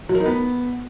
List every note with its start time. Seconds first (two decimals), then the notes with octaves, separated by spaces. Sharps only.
0.09 F#3
0.15 A#4
0.20 D#4
0.26 B3